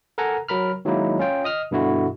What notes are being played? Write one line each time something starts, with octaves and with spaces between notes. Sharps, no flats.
A4 A#4 F#5 G#5 A#5
F#3 A#4 B5 F6
D#3 F#3 G#3 A#3 D#4 E4
C#4 F4 G5
D#5 D#6 F6
G2 B2 D3 E4 F#4